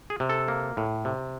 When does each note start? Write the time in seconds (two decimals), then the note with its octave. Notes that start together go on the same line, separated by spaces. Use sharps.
0.10 G#4
0.20 C3
0.29 A4
0.48 A#3
0.77 A2
1.05 C3